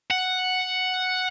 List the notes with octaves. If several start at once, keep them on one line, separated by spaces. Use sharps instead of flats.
F#5